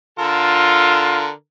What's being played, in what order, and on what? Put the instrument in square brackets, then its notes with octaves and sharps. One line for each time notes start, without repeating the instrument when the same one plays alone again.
[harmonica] D3 A4 A#4 [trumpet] F4